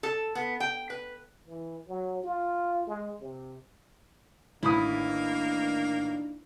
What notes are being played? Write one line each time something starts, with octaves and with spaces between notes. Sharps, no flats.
A4
B3
G5
B4
E3
F#3
F4
G#3
C3
A1 D#3 A#3 D4 E4 B5 D#6